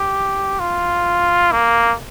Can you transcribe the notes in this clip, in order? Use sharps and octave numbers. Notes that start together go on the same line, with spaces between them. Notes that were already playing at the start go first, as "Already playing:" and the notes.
Already playing: G4
F4
A#3